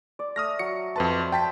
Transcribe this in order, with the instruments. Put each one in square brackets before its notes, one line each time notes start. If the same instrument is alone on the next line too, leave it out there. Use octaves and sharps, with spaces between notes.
[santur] D5
[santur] A3 [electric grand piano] D#6 F6 A#6
[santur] F#3 [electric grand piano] C#7
[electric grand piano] F2 B4 A5 [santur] C5
[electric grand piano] G5 A5 B6